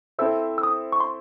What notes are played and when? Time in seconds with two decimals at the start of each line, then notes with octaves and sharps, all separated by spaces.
0.19 C4 E4 A4 C5 E5 E6
0.58 E6
0.63 D#6
0.92 C#6
1.00 C6